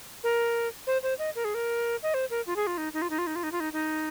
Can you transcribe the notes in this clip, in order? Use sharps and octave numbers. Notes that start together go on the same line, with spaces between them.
A#4
C5
C5
D#5
A#4
G#4
A#4
D#5
C5
A#4
F4
G#4
F4
D#4
D#4
F4
D#4
F4
D#4
F4
D#4
F4
D#4
D#4